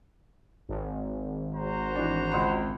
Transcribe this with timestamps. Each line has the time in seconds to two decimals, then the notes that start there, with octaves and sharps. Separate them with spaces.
0.69 G#1
1.55 F#4 C5 A#5
1.95 E3 D4
2.32 C#2 F#5 C6